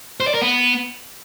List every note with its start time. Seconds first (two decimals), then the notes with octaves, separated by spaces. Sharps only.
0.20 C5
0.27 D5
0.34 A#4
0.41 B3